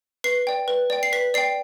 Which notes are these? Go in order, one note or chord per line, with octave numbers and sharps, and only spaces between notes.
B4 C7
D5 G5
B4
D5 G5
C7
B4 B6
D5 G5 C7